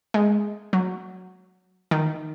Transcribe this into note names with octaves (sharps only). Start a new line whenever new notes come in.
G#3
F#3
D#3